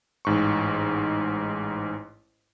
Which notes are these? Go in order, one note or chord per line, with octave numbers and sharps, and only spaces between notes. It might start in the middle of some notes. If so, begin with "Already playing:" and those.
A1 G#2 C#6